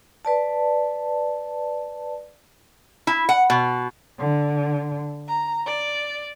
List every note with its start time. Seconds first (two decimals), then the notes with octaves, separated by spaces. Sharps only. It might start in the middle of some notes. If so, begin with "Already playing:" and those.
0.25 B4 D5 A5
3.07 E4
3.29 F#5
3.50 B2
4.18 D3
5.28 A#5
5.67 D5